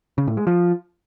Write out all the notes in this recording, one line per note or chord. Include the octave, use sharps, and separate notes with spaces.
C#3
A2
G#3
F3